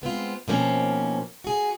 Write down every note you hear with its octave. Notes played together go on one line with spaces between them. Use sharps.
G#3 B3 C4 F4
B2 D#3 F3 A#3 C4 C#4
F#4 G#4